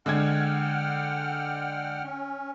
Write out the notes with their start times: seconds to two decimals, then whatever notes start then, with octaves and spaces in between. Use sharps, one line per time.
0.06 D3 G#3 F#5 G5 F6 G#6
2.03 C#4